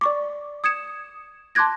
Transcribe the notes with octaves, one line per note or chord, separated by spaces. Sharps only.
D5 C#6 D6
D#6 G#6 C#7 E7
A5 C6 D6 F#6 G#6 A#6